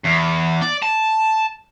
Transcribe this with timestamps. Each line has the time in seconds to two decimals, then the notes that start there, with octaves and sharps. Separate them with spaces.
0.04 E2
0.62 D5
0.83 A5